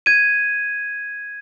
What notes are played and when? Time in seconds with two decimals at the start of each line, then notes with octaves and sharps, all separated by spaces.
0.06 G#6 D#7